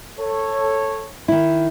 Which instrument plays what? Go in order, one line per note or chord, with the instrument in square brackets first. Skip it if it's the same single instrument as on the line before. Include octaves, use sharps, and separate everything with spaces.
[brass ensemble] A4 C#5
[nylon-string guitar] D#3 E4